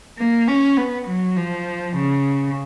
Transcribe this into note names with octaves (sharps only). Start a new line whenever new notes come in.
A#3
C#4
B3
F#3
F3
C#3